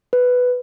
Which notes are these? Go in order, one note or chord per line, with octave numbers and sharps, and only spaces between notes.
B4